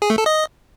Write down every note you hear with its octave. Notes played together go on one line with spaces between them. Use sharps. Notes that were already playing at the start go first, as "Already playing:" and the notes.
G#4
A3
A4
D#5